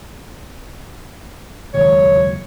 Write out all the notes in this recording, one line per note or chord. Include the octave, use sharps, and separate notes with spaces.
F#1 D#2 G#3 C#5